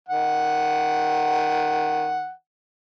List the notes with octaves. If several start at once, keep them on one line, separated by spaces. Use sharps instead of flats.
D#3 F#5